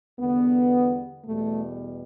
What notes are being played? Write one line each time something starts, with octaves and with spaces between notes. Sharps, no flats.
E2 D3 G3 B3
E2 B2 G3 A3